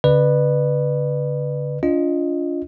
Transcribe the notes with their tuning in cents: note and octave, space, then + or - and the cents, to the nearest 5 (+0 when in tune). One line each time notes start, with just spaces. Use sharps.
D3 -45 B4 +0 D5 +40
D4 -30 F4 -5 D#5 -5